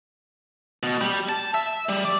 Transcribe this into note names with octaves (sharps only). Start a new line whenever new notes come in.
B2
G3
A5
E5
G3
D5